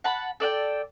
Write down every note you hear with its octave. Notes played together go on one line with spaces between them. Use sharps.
F#5 A5 B5
A4 D5 F#5 G5